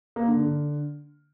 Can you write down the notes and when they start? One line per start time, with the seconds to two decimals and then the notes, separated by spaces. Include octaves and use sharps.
0.16 A#3
0.28 D3
0.39 D3